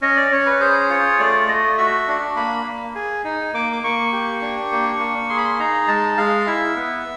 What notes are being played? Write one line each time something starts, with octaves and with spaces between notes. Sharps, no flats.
C#4 D#5
D5
C#4 C#5
B4
G#4 C5
F4 C#5
A3 D5
A3 D#5
F#4 E5
D4
A#3 B5
A#3
G#4
D#4
A#3 D6
D6
A#3 C#6
G4
D4
A#3
A#3
G#4 C6
B5
C6
D#4 A#5
G#3 A5
G#3 F5
E4 E5
B3